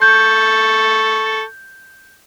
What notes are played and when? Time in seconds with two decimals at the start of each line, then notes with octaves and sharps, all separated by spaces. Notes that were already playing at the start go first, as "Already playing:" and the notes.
0.02 A4 C#6 G6